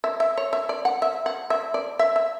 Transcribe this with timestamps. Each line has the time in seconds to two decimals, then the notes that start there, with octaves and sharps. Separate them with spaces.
0.04 E5
0.20 E5
0.37 C#5
0.53 E5
0.69 D5
0.85 F#5
1.02 E5
1.26 F#5
1.50 E5
1.74 D5
1.99 E5
2.16 E5